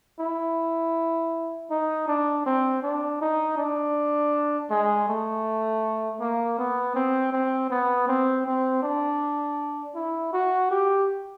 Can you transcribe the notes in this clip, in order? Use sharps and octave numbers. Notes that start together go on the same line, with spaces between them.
E4
D#4
D4
C4
D4
D#4
D4
G#3
A3
A#3
B3
C4
C4
B3
C4
C4
D4
E4
F#4
G4